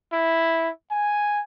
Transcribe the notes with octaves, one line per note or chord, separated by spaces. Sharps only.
E4
G#5